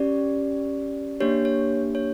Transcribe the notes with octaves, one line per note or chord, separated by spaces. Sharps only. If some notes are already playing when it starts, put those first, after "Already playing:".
Already playing: C#4 G4 D5
A#3 D4 G4 C#5
C#5
C#5